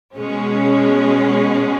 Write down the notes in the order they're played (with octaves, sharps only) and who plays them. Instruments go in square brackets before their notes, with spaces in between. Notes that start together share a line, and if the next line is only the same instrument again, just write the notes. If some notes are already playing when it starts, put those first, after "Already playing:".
[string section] B2 G#3 C#4